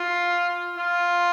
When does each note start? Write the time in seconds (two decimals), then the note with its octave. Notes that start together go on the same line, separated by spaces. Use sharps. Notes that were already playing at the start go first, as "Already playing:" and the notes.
Already playing: F4
0.77 F4